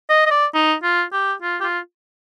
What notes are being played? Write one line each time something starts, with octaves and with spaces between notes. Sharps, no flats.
D#5
D#5
D5
D#4
F4
G4
F4
G4
F4